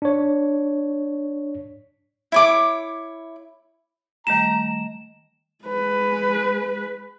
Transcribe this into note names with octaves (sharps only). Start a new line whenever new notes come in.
D4 C#5
E4 C#5 D6
D#3 G3 A3 A#5 E7
G#3 B4